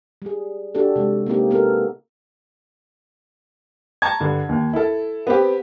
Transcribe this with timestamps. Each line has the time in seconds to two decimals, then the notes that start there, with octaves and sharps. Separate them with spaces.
0.22 G3 G#4
0.75 D4 F#4 G4 A4
0.96 C3 G#3
1.26 A#3 C4 D#4 G4
1.51 B3 F#4 G4 A4 A#4
4.02 A5 A#5 C#6 G#6
4.20 G2 D3
4.49 D#2
4.73 E4 A4
5.27 B3 C4 G4